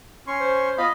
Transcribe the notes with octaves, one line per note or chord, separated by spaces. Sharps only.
C#4 C6 C#6
C5
B3 F4 D#5 F5 B5